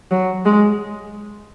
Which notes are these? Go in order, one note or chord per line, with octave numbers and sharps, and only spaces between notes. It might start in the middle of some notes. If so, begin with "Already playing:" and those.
F#3
G#3